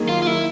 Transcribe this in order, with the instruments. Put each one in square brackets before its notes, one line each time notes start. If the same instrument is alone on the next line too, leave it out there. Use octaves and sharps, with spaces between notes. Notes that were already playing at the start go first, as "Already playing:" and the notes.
Already playing: [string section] D#3 F#3 A#3 G#4
[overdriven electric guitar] F4
F4
E4